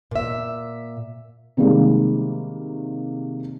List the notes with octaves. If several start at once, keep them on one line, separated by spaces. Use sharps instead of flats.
A#2 E5
C3 D#3 G3 G#3 A#3